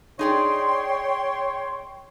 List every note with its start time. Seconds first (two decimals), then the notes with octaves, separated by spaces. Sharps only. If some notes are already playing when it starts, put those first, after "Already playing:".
0.19 D#4 G#4 C#5 D5 G5 C6